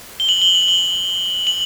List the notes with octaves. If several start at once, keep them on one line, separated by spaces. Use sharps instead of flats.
G7
F#7
G7
F#7
G7
F#7